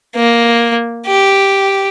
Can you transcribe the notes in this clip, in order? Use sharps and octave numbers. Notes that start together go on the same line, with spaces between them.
A#3
G4